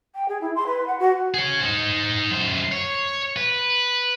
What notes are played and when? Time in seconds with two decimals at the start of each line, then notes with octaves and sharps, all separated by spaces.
0.15 G5
0.29 G#4
0.41 E4
0.55 C6
0.67 B4
0.87 F#5
0.99 F#4
1.34 G#4 C#5
1.61 D#4 C5
2.30 F#2 C5
2.72 C#5
3.37 B4